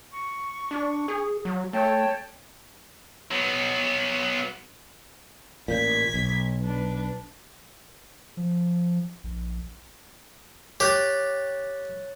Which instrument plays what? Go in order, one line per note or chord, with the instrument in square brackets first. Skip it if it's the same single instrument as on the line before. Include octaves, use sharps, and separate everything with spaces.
[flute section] C#6
[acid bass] D4
G#4
F#3
[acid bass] A3 [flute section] C#5 G5 A5
[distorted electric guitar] F#3 B3
[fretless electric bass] A1 A#2 [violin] G#6 B6
[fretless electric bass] B1
[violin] D4 B4
[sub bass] F3
A#1
[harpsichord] G4 [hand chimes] C#5 F#6 A6